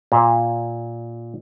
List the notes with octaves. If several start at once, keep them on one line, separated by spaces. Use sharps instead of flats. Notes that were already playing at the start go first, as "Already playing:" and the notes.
A#2